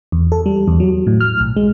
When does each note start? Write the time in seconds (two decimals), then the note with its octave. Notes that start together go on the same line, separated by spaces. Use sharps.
0.12 E2
0.32 A4
0.46 G3
0.68 E2
0.80 F#3
1.07 A2
1.21 F6
1.40 B1
1.57 G#3